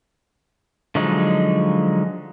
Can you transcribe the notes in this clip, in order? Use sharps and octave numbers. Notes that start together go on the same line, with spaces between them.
D3 F3 F#3 G#3 D#4